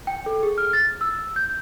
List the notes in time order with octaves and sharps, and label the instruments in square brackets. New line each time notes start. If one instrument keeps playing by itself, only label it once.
[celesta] G5
A4
G#4
F6
A6
E6
G6